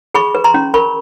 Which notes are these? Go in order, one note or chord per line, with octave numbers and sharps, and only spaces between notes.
G#4 B5 C#6
B4
A#5 C6
C#4
A#4 B5 C#6